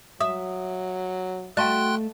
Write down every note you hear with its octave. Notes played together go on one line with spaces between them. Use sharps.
F#3 E5 D#6
A3 F#4 D#5 F5 G5 A5 C6 F#6